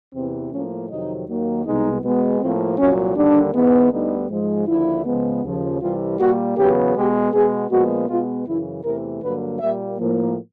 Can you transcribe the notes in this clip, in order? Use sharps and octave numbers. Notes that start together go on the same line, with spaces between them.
E2 C3 E3 C4
A2 F3 A#3 C#4
F2 C3 D#3 F#3 D#4
D#2 D#3 F#3 A#3
C2 B2 G#3 B3 D#4
B2 G#3 B3
A2 F3 A#3 C4
C2 A#2 F#3 C#4
D#2 D3 G3 A#3 D4
G#2 E3 G#3 B3
D2 D3 G3 B3 D#4
G#2 F3 G#3
D#2 D3 F3 E4
C#2 C#3 F3 G#3 B3
D#2 C#3 F3
C2 C3 E3 G3 F4
A#2 G3 A#3 F#4
E2 C#3 F#3 B3 G4
B2 G#3 B3 G4
B2 G#3 B3 G#4
A#2 F3 G#3 B3 F#4
B2 G#3 B3 F4
F#2 C#3 E3 E4
E2 C3 E3 A3 A#4
G2 D3 F#3 A#3 B4
A#2 G3 A#3 E5
A2 F3 A#3